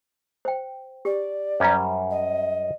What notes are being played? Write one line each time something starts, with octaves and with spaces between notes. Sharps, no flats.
C5 G5
G4 D5
F#2 G3 C#4 C5 A#5
D#5